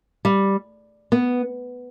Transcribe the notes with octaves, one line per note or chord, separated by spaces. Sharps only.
G3
B3